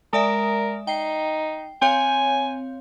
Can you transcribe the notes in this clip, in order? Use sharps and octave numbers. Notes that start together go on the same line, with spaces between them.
G#3 A#4 D5 E5
D#4 G5 C7
C4 C#5 F5 G#5